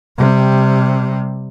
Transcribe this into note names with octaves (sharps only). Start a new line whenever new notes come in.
C3 G3